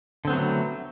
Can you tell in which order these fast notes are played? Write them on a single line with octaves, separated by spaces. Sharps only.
D3 C4 B3 F#3 A3